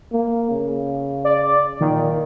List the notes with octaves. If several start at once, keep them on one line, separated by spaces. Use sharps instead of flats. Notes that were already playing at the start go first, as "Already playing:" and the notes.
A#3
C#3
D5
A#2 D#3